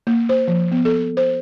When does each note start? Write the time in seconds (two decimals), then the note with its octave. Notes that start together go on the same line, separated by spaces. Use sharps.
0.07 A#3
0.29 C5
0.48 F3
0.72 B3
0.85 A4
1.17 C5